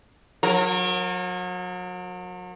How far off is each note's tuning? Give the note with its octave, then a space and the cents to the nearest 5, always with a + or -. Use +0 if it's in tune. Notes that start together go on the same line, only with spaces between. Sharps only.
F#3 -35 A#4 +0